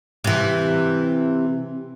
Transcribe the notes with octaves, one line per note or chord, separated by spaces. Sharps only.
C3 E3